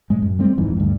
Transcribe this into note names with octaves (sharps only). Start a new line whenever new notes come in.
A2 G#3
F#2
G3 A3 C4
D1 F2 G#2 E3
D2 G2